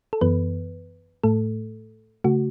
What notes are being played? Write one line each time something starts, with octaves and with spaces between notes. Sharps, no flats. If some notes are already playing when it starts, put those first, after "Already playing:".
A4
F#2 E3 B3 B4
A2 A3 A4
C#3 A3 F#4